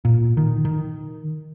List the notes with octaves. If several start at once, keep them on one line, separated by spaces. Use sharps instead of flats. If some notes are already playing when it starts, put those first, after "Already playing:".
A#2
D#3
D#3